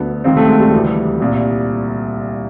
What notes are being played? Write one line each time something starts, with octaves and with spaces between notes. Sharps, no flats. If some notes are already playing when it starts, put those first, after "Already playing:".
Already playing: D2 D3 B3
C#2 C3 D#3 C4
A3
G#3
G3
D2 C3 E3
C2 A#2